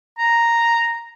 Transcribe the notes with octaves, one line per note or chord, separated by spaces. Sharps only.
A#5